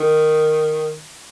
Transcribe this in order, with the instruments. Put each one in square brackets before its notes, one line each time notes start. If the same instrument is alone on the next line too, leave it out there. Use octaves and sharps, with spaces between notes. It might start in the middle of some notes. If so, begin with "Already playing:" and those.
Already playing: [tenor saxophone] D#3